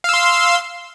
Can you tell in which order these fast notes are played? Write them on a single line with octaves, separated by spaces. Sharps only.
F5 E6 C6